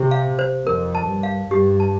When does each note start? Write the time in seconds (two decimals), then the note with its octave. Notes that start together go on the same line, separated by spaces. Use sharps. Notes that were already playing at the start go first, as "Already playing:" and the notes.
Already playing: C3 G4
0.11 F5
0.39 C5
0.67 F2 A#4
0.95 A5
1.09 G2
1.23 F5
1.51 G2 G4
1.80 A5